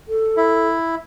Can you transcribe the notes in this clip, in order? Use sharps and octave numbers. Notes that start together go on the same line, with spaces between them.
A4
E4